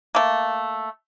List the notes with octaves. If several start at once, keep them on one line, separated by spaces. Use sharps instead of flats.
A3 A#3